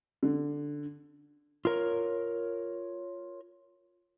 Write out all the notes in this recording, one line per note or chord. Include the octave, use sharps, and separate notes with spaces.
D3
F4 A#4 C#5